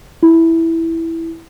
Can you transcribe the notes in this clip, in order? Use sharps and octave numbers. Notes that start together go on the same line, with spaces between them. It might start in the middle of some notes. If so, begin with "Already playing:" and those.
E4